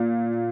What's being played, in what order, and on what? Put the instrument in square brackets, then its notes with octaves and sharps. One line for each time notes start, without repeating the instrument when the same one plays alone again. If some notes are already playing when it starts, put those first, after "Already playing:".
Already playing: [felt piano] A#2